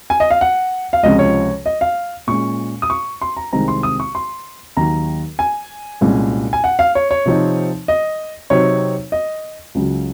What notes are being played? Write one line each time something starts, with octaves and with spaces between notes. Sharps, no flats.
G#5
D#5
F5
F#5
F5
C#2 C3 F3 G#3 C#4 D#5
C#5
D#5
F5
A#2 G#3 C#4 C#6
D#6
C#6
C6
A#5
C2 C3 D#3 G#3 C4 A#5
C6
D#6
C#6
C6
D#2 D#3 F#3 A#5
G#5
C2 A#2 G#3 C#4
G#5
F#5
F5
C#5
C#5
C3 F3 C4 D#4
D#5
C3 F#3 C4 D#4 C#5
D#5
C#2 C#3 F#3